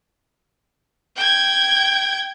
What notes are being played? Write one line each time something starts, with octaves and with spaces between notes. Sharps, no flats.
G5 G#6